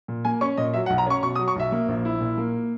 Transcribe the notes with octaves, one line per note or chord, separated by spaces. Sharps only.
A#2
A#3 G#5
C#4 C#6
A#2 D#5
F#3 E5
F#5
B1
A#5
C#4 C#6
B2 C#6
D#6
F#3
C#6
B1 E5
A#3
A#1
E4
A#2
A#3